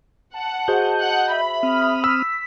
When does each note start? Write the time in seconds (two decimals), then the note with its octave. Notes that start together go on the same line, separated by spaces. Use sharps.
0.34 F#5 A5
0.68 F#4 G#4 C5 D#5 G6
1.00 F#5
1.31 E5 B5
1.63 C4 D#6 F6
2.04 E6 B6